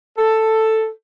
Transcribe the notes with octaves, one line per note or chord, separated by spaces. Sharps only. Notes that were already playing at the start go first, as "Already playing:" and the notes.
A4